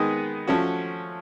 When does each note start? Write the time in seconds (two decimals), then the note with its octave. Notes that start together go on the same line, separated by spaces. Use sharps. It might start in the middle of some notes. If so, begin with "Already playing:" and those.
Already playing: D#3 G#3 B3 D#4 G#4
0.47 F3 A3 C#4 F#4